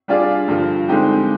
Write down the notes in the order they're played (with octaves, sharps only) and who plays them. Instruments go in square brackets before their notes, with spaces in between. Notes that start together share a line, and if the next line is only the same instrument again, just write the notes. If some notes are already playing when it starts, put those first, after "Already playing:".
[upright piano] G3 D4 F4 G#4 D5
G2 D3 F3
D3 G#3 C4 D#4 G4